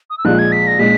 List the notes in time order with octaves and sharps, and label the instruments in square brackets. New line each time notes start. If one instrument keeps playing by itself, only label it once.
[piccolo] D#6
E6
[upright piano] A#1 A#2 G#3 [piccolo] F#6
[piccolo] G#6
B6
A#6
[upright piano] A#2 G#3 [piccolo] B6